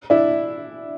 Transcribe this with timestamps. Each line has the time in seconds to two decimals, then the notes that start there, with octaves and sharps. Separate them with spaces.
0.10 D4 E4